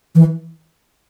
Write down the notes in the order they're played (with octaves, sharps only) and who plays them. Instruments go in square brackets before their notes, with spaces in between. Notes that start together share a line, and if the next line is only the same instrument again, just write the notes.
[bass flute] E3